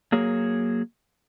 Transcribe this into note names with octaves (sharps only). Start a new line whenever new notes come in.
F#3 A#3 G#4 C#5